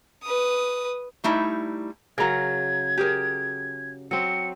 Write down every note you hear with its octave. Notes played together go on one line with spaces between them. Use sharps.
B4 D#6
G3 A3 D#4 E4
C#3 F#3 A#4 A#5 G#6
G4 G#4 A#4
F#3 C4 C#7